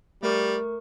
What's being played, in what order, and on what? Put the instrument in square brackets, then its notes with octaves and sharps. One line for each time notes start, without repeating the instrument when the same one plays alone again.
[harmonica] G3 [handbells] A3 A#4 C#6